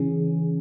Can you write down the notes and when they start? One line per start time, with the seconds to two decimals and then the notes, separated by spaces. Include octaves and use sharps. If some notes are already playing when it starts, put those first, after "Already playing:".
Already playing: C#3 E3 C#4 G#4